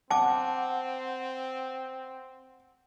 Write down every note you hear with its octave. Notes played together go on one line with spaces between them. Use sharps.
C4 F#5 A5 D6